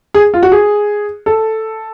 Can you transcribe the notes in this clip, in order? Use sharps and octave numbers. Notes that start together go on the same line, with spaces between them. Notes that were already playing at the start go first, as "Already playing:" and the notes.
G#4
F4
F#4
G#4
A4